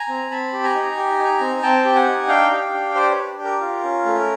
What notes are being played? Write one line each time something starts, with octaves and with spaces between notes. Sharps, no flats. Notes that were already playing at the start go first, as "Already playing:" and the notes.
Already playing: G#5 A#5
C4
C4 A5 B5
G4
G#5 A#5
D#4
G4
D#4
C4
C4 G5 A5
G4
F#5 G#5
D#4
D4 F5 G5
G4
D4
G4 C5 D5
B4 C#5
D4
G4
A#4
F4
C#4
A3